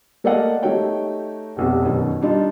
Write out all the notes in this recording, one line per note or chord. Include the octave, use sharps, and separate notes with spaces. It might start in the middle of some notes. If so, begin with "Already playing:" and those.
A3 A#3 D5 D#5 F5 F#5
A3 D#4 F#4 G4 C#5 G5
F1 B1 B2
F#2 B2 D#3
G3 D4 D#4 F4